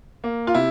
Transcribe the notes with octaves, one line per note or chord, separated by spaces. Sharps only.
A#3
F4
C3 E4